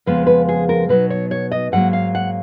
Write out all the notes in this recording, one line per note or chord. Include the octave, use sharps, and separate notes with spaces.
F2 C#3 F3 G#3 B3 B4
B4
G#4
A#4
B2 F#3 B3 D#4 B4
C#5
C#5
D#5
G#2 F#3 A#3 F#5
F5
F#5